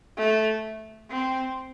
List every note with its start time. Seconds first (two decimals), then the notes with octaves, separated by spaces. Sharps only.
0.17 A3
1.10 C4